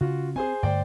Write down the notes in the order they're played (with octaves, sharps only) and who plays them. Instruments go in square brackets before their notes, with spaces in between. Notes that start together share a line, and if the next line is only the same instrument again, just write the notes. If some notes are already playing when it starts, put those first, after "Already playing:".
[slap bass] C#3 [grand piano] F4 F#4
[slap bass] C4 [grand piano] G#4 C5 G#5
[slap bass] G2 D3 A3 [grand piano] C5 D5 G5